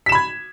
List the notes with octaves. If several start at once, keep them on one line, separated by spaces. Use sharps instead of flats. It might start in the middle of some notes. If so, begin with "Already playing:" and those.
B5 G#6 B6 E7